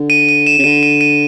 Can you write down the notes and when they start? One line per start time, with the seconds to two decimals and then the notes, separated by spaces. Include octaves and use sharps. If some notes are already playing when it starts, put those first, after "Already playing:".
Already playing: D3
0.10 D#7
0.29 D#7
0.47 E7
0.58 C#3
0.64 D3 D#7
0.83 D#7
1.01 D#7